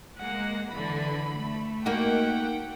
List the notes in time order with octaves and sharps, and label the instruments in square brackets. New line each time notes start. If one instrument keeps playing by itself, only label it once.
[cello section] G#3 A#3 [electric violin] F#5
[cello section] D3 E3 [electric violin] B5
[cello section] A3
[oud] A#3 D#4 F#4 [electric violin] F#5 G5